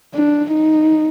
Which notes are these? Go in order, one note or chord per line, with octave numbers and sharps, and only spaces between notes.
D4
D#4